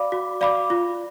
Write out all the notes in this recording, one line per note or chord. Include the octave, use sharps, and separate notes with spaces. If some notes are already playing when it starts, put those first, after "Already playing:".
Already playing: F#4 D5 F5 B5 D6
F#4
D5 F5 B5 D6
F4